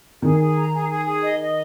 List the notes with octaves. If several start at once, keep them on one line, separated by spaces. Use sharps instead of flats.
D#3 G#4
G#4
A#5
G#4
G#4
G#4
D#5
D#5